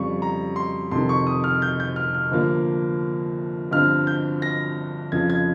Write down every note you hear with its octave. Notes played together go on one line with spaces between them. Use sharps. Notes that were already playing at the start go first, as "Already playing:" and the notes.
Already playing: F2 C#3 G3 C#6
A#5
C6
F2 C3 D#3 C6
C#6
D#6
F6
G6
G6
F6
F6
G1 G2 F3 A#3
G1 G2 F3 C4 F6
G6
A#6
F2 C#3 F3 G#6
G#6